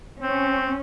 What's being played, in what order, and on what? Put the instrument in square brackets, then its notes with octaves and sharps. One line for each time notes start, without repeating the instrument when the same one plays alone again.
[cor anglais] C4 [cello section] C#4